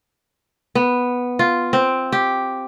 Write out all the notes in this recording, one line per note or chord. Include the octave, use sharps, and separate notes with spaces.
B3
F4
C4
G4